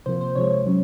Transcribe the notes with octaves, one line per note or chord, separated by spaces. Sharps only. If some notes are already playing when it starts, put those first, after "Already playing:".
C3 F3 A#3 C5
C5
C3 F3 G#3 C#5
F#3 C#4